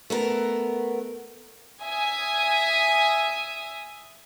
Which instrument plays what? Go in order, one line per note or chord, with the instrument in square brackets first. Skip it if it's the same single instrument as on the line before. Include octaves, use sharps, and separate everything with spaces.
[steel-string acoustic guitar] A3 B3 A#4
[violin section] E5 G#5 D#6